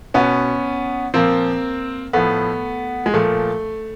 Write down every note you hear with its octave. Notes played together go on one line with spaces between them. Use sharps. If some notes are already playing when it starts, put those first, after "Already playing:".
B2 B3 C#4
A#2 F3 A#3 C4
A2 F3 A3 B3
G#3
A#2 F3 A3